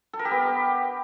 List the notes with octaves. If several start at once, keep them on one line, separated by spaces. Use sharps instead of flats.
A4
A#4
G4
B3